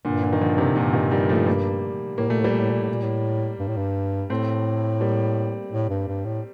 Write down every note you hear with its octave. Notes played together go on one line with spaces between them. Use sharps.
G2 A#2 D3
A#2 D3
D#3
D3 F3
C3 D#3
G2 A#2 D3
C3 D#3
D#3 G3
F3 A3
G3 A#3
A2 A#3
A#2 A3
A2
G3 A#3
A#2
A2
A#2
A2
A#2
A2
G2
A2
G2
A2 A3 C4
G3 A#3
A2
G2
G2
A2